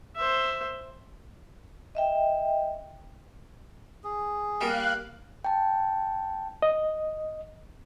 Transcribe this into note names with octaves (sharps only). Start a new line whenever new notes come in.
C5 E5
D#5 E5 G5
G#4
G3 A#3 F5 F#6
G5 A5
D#5